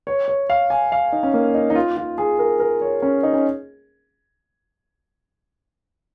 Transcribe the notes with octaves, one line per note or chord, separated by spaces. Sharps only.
C#5
C#5
F5
G#5
F5
D#4
C#4
A#3
D#4
D#4
F4
F4
G#4
A#4
A#4
C#5
C#4
D#4
C#4